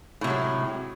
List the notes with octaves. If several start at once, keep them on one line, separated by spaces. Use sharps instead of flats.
A2 C3 F#3 G#3